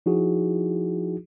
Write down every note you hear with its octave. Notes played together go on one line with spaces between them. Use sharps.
F3 D#4 E4 F#4 G#4